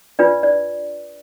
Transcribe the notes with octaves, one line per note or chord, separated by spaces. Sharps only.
D4 F4 B4 D5
D5